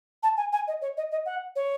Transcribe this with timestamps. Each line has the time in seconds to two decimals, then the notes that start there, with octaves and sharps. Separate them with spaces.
0.23 A5
0.37 G#5
0.52 G#5
0.67 D#5
0.81 C#5
0.97 D#5
1.11 D#5
1.26 F#5
1.55 C#5